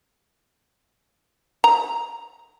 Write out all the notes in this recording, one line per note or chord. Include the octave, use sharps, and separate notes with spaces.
A#5